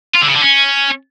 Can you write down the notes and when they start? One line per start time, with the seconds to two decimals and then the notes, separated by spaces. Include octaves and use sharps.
0.14 F4
0.21 D3
0.28 C#3
0.35 D3
0.42 C#4